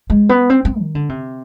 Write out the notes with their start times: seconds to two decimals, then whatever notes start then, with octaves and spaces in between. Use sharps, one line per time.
0.10 G#3
0.29 B3
0.50 C4
0.65 C4
0.80 D#3
0.95 D3
1.09 C3